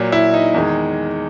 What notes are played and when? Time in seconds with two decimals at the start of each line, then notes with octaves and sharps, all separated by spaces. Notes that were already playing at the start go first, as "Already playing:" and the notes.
Already playing: A#2 F#3
0.12 E4
0.34 D#4
0.54 E2 D#3 G#3